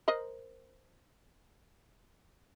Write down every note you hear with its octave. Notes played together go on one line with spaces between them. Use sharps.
A#4 C5 D#5